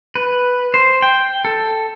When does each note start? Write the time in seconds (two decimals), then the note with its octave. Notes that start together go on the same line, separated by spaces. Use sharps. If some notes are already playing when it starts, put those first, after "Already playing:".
0.15 B4
0.74 C5
1.02 G5
1.45 A4